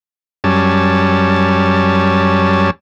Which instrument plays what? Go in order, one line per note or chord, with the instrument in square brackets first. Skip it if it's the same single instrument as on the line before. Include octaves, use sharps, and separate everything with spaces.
[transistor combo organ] F#2 G3 C#4 A5